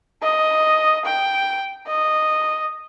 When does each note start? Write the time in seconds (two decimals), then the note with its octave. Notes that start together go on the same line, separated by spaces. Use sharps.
0.23 D#5
1.05 G5
1.87 D#5